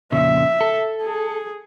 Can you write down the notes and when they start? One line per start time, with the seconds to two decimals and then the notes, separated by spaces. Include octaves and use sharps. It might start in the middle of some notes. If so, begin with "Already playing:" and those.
0.12 F2 A#2 C#3 E5
0.61 A4
1.03 G#4